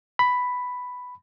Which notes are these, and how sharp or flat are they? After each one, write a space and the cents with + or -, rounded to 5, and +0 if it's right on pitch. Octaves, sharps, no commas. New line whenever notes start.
B5 +5